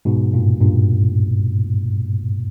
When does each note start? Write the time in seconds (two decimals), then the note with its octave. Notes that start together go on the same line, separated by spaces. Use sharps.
0.05 G#2 B2
0.34 G2 A#2
0.61 G2 A#2